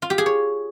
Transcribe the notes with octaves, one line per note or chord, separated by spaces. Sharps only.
F4
G4
G#4
C#5